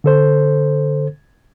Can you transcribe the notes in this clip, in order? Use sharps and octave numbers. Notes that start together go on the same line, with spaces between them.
D3 A4 C5